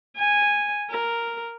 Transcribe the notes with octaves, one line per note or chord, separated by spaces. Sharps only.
G#5
A#4